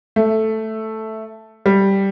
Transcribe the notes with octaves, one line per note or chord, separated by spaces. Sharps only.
A3
G3